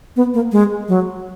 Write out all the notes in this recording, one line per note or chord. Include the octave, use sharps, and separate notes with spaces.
B3
A#3
G#3
F#3